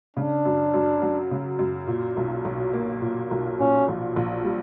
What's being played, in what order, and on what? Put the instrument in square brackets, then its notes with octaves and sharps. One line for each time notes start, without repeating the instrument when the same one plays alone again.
[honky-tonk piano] C#3 [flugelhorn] D4
[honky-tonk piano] F#2
F#2
F#3
C#3
F#2
A#2
B1
B1
A#3
A#2
B1
[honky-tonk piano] A#2 [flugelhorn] C#4
[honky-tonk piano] A#1
A#1
G3